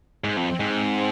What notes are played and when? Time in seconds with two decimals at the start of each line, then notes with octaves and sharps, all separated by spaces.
0.24 G#2 C4
0.37 F2
0.60 G#2